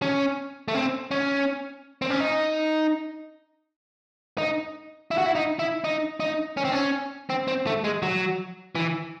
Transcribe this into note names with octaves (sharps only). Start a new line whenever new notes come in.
C#4
A3
C4
C#4
C4
C#4
D#4
D#4
E4
F#4
E4
D#4
E4
D#4
D#4
C#4
C4
C#4
C4
C4
A3
G#3
F#3
E3